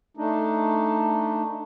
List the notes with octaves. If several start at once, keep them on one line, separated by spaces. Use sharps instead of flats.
A3 D4 D#4